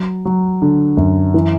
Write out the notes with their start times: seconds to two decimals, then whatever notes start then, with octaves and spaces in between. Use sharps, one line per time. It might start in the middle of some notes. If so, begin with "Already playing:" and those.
Already playing: F#3
0.25 F#3
0.62 D3
0.97 F#2
1.34 E3